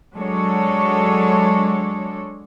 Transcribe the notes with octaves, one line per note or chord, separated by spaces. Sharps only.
F#3 G#3 D4 A4 C#5